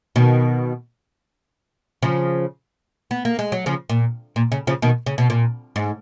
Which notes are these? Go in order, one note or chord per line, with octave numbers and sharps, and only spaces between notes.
B2 D#3
C#3 F3
B3
A#3
G#3
F#3
C#3 F3
A#2
A#2
C#3
C#3 F3
B2 D#3
C#3
B2
A#2
G#2